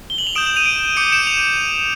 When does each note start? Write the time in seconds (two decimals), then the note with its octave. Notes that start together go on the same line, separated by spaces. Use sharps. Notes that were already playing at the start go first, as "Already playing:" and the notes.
0.10 G7
0.18 F#7
0.27 F7
0.35 D#6 G6 D7 E7
0.46 E7 F#7
0.56 D#7 F7
0.66 D7 E7
0.96 D6 G6 C#7 D#7
1.12 D7 E7
1.27 D#7 F7